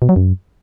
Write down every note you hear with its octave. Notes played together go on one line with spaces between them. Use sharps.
B2
F#3
F#2